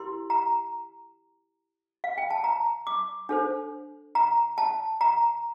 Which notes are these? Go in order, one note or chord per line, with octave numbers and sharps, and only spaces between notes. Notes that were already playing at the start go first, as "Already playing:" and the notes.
Already playing: E4 G4 A#4 C6
A#5
F5
G5
A5
A#5
D6
D4 A4 C5
A#5
A5
A#5